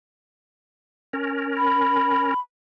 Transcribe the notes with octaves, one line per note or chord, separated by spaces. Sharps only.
C#4 A#4
B5